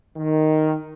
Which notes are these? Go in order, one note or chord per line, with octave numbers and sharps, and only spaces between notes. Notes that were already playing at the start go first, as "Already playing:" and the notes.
D#3